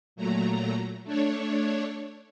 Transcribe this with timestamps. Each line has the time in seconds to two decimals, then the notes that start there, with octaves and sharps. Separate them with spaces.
0.16 A#2 F#3 A3 A#5
1.04 A3 D4 C#5